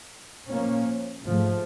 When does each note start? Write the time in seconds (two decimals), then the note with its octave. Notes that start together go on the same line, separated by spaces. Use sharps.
0.49 A#2 F3 A#3 C#4
1.24 G#2 F3 A3